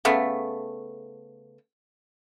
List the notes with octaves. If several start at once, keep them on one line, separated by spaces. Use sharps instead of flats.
C#3 A3 B3